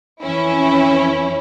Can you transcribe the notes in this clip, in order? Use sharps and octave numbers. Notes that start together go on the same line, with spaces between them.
F2 E3 C#4 E4